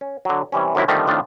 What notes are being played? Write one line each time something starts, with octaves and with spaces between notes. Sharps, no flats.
C#4
D3 F#3
C3 E3 G3 C#4
F#2 A2 C3 D#3 F#3 E4
D3 D#3 F3 G3 A3 C4
F2 A2 D#3 A3 D4 F4